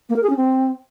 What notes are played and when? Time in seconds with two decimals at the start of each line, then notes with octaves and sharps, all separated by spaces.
0.09 A#3
0.16 A#4
0.23 G#4
0.29 C#4
0.36 C4